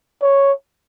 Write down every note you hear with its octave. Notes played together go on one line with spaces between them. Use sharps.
C#5